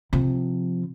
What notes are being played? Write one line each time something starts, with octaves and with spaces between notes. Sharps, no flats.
C3 F3